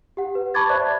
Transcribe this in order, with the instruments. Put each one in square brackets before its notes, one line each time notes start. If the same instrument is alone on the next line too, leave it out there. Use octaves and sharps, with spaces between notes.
[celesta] G4 F#5
B4
A5 B5 C#6 D6 G#6 A6
C5 D5 E5 B5 F#6